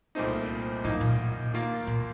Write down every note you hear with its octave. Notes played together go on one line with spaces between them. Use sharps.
C2 A#2 A3 C4 D#4
F#2 A2 D#3 A#3 D#4
A#2
D#2 D#3 A#3 F4 A#4
A#2